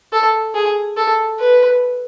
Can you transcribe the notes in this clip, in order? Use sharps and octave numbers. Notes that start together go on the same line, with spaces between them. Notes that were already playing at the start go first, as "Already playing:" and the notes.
A4
G#4
A4
B4